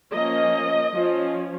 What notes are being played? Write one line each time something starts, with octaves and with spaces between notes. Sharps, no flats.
F3 A#3 C#4 D#5
F3 C#4